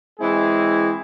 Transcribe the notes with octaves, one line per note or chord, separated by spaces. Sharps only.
E3 G#3 C4 E4 G#4